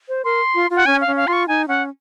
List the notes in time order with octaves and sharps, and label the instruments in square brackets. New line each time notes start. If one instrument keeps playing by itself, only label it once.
[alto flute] C5
[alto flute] A#4 [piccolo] C6
[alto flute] F4
F4
[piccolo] F#5
[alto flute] C#4 [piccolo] G#5
[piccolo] F5
[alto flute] C#4
[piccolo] F5
[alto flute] F4 [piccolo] C6
[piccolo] C#6
[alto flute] D#4 [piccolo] G#5
[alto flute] C#4 [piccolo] F#5